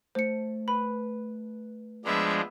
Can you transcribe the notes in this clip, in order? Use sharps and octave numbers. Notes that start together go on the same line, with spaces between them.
A3 C5 C#7
B4 B5
F3 G#3 B3 D4 E5